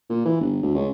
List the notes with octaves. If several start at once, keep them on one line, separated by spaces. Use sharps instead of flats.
A#2
E3
G1
D2
C#2